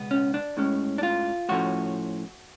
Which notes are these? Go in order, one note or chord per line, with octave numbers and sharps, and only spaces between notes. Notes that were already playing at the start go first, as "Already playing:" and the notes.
Already playing: C#2 B2 G#3 B3
C#4
D4
A2 G#3 C#4
D4
F4
A2 F3 A3 C#4 F#4